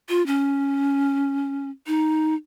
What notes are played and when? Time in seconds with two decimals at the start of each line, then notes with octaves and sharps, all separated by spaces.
0.09 F4
0.26 C#4
1.87 D#4